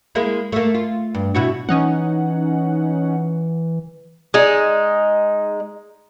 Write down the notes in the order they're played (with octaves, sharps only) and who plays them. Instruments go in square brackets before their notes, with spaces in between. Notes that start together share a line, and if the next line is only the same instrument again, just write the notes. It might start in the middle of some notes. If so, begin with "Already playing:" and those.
[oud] G#3 A#3 E4
A3 A#3
F4
G2
B2 E4 F#4
[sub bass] E3 [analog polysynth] C#4 D#4 F#5
[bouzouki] G#3 D#4